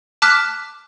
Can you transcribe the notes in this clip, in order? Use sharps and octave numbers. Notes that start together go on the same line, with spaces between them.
A5 D6 F6 F#6 B6